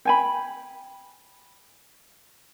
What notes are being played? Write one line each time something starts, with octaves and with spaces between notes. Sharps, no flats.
G5 G#5 B5